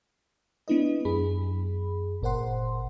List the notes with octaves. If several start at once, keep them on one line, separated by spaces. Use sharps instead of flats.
B3 D4 E4 B4 D#5
F#2 G#4 B5
G1 A#2 A#4 C5 F#5 C6